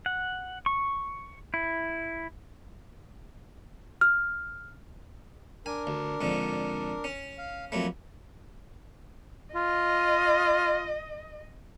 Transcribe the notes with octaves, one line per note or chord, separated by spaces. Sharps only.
F#5
C#6
E4
F6
D4 A#4 G#5
D2
F2 G#2 D3
C#4
F5
F2 F#3 A3 A#3 B5
F4 D#5